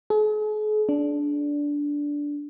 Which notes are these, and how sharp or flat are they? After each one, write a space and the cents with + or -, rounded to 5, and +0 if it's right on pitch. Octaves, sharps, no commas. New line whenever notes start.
G#4 +45
D4 -10